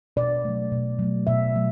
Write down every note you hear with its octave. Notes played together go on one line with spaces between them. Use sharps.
B2 D5
F#3 A3
B2
F#3 A3
B2 E5
F#3 A3